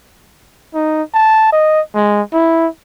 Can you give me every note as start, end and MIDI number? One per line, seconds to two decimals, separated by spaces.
0.75 1.02 63
1.14 1.51 81
1.52 1.81 75
1.95 2.21 56
2.34 2.67 64